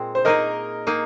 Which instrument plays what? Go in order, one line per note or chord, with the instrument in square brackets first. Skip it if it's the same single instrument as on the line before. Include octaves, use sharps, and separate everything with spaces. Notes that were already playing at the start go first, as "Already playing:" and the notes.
Already playing: [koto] A#2 G#3 C4
[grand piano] C5
[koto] A#3 D#4 G#4 [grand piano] A#4 D#5
[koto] A#3 D#4 G#4